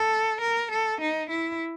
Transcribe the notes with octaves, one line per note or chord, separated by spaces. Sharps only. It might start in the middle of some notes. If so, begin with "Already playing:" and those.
Already playing: A4
A#4
A4
D#4
E4